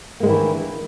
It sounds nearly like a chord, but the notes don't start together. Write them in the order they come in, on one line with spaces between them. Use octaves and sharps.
A#3 G#3 D#3 E3 D4